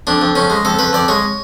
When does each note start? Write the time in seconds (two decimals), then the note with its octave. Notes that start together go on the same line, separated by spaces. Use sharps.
0.07 F2 D4
0.22 F2
0.35 F2 C#4
0.50 G#3
0.65 F2 A4
0.79 F2 B4
0.93 F2 D5
1.08 G#3 C#5